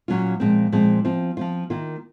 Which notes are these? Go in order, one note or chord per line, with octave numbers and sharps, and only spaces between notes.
A#2 F#3 C#4 F4
A#2 F3 G#3 C4
A#2 F3 G#3 C4
F3 C4 F4
F3 C4 F4
D#3 A#3 F4